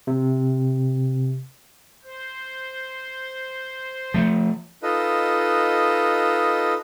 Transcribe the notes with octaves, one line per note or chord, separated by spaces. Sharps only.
C3
C5
F3 A3
D#4 F4 A4 B4 D#5